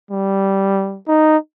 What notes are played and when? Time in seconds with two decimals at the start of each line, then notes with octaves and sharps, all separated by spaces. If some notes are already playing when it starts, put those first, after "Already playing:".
0.11 G3
1.08 D#4